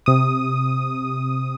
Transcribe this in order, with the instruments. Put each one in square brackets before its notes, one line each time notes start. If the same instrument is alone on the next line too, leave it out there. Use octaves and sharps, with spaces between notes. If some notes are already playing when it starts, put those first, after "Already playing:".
[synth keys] C3 D#6